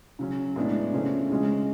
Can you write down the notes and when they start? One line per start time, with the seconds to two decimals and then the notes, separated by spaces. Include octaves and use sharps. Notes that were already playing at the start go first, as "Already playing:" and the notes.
0.19 C#3 F#3 C#4
0.56 A2 G#3 B3 D4
0.93 C#3 F3 A3 C#4
1.30 C#3 G#3 C#4